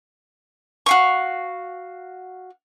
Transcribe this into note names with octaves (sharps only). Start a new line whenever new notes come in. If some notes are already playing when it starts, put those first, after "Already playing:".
F#4 F5 C#6